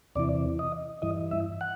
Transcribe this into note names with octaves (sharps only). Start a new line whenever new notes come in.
E2 C3 E3 D5
D#5
G2 E3 D#5
E5
F#5